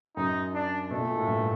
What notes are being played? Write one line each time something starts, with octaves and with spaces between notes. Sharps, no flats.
F#2 D#4
D4
B2 A3
A#2
A2
G2